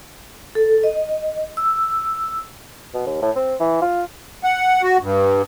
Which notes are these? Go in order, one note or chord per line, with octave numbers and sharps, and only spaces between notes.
A4
D#5
E6
B2
D#2
A2
C4
E3
F4
F#5
F#4
G2